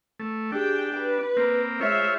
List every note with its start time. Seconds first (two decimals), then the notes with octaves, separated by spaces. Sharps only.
0.20 A3
0.52 D4 G4 G#4 G5
0.96 B4
1.37 A#3 C4
1.81 G#3 F4 C5 C#5 E5